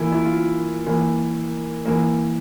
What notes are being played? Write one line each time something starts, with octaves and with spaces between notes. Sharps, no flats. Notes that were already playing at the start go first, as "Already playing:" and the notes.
Already playing: E3 A#3 E4
E4
F4
E3 A#3
E3 A#3